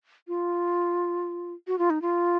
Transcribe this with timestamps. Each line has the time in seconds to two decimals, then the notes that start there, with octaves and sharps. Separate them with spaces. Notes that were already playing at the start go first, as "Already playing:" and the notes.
0.28 F4
1.67 F#4
1.79 F4
1.90 D#4
2.02 F4